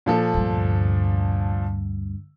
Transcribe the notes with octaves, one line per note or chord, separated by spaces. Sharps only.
A#2 F3 A4
D2 G2